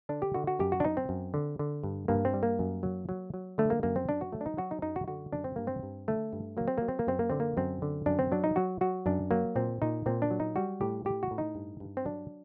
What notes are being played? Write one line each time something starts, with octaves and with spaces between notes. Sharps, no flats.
D3 D4
G4
D3 F#4
F#4
F#2 G4
F#4
D4
F#2 D#4
C4
F#2
D3
D3
G2
G2 A#3
C4
G3
A#3
F#2
F#3
F#3
F#3
D3 A3
A#3
F#2 A#3
C4
F#2 D4
F#4
F#3 A3
D4
D#4
F#3 F#4
D#4
F#2 D#4
F#4
D3 F#4
F#2 D4
C4
G2 A#3
C4
G2
D3 A3
G2
F#3 A#3
C4
F#3 A#3
C4
A#3
F#2 C4
A#3
D3 C4
A#3
F#2 C4
D3
F#2 D4
C4
F#3 D4
D#4
F#3 F#4
F#3 F#4
F#2 D4
F#3 A#3
A#2 C4
A#2 D#4
A#2 C4
D4
F#3
D#4
G3 F#4
A2 G4
A2 G4
F#4
A2
D#4
G2
G2
C4
F#3 D4